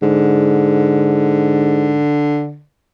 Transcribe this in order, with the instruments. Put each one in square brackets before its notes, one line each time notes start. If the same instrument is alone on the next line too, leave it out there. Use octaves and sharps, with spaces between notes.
[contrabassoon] G#2 [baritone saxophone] D3